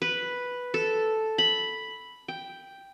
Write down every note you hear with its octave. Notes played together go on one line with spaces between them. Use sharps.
B4
A4
B5
G5